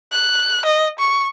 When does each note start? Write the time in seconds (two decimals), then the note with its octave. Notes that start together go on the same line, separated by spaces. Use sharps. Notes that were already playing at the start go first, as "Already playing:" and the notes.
0.12 F#6
0.65 D#5
0.99 C#6